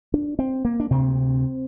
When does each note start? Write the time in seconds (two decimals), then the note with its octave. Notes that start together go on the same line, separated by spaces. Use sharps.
0.14 D4
0.39 C4
0.65 A#3
0.80 D4
0.91 D2 C3 C4